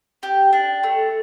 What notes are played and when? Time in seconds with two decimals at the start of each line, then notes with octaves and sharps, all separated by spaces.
0.23 G4
0.53 D4
0.83 A3